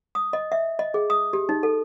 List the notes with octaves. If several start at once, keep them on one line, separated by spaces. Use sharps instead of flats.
D#6
D#5
E5
D#5
G#4
D#6
G4
D#4
A4